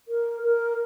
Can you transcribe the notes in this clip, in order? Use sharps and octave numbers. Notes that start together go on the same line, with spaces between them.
A#4
A#4